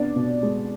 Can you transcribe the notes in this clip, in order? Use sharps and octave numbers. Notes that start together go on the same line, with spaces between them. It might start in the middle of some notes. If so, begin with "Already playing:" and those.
Already playing: C3 B3 D4 D5
B2
G#3